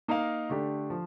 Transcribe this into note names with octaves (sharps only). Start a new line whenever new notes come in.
A#3 D#4 A#4 F5
D3 A3 D4 G4
F3